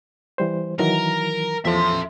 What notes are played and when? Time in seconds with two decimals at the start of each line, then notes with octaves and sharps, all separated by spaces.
0.38 E3 G3 C5
0.79 D#3 E3 F#3 A#4
1.65 E2 F3 A4 E5 C6